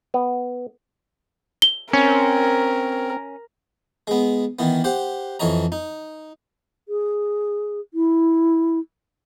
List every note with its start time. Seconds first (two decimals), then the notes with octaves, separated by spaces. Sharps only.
0.14 B3
1.62 G7
1.93 C4 C#4 A#4
4.07 G#3 B3
4.59 D#3 E3 B3
4.84 G4 C5 F#5
5.40 F2 E3 C#5 D#5 A#5
5.72 D#4
6.88 G#4
7.94 E4